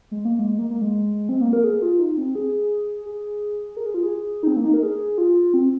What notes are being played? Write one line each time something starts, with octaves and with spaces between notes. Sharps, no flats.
G#3
A#3
G#3
A#3
A#3
G#3
C4
A#3
A#4
G#4
F4
D#4
C4
G#4
G#4
A#4
G#4
F4
G#4
D#4
C4
A#3
D#4
A#4
G#4
F4
C4